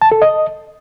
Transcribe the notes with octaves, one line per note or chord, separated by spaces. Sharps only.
A5
A4
D#5